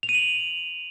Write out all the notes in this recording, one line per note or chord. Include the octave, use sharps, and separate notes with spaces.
F7
D#7
F#7